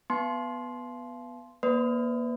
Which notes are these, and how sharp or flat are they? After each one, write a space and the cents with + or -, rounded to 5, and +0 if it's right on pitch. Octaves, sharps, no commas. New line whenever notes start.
B3 +0 A5 -35 C6 +0
A#3 +30 B4 +35 D5 -20